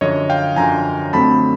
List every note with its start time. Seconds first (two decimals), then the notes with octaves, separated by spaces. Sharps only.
0.01 F#2 D3 F3 C#5 D#5
0.30 F5 G5
0.56 F#2 D3 F3 G#5 A#5
1.13 F2 D3 F#3 A3 C4 A5 B5